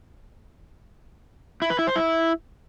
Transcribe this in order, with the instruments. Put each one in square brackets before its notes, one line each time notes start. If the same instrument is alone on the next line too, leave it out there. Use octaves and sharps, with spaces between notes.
[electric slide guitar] E4
B4
E4
C5
E4